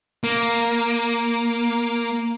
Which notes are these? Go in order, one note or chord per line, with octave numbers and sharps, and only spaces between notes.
A#3